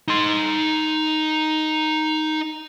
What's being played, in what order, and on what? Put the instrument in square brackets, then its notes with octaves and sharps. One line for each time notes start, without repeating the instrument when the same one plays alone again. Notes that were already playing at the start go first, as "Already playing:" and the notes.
[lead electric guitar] D#4 C6